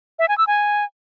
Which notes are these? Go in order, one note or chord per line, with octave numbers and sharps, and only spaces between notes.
E5
G#5
E6
G#5